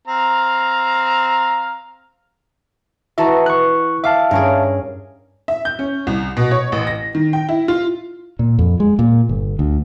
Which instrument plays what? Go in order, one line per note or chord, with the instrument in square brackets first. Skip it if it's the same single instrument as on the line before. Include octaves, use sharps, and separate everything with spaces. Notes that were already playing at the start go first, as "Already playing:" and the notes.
[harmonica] C4 F5 A#5
[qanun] E3 F#4 D#5 [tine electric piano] E5 A5 A#5
[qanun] B4 [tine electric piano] C#6 F#6
[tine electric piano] E5 F5 A5 [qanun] D6
[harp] G2 C#4 D7 [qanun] G#4 A#4
[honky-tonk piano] E5
G6
C#4
C2
B2
C#5
A1
A#6
D#3
G5
E4
F4
[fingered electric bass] A#2
F2
G#3
A#2
G1
D2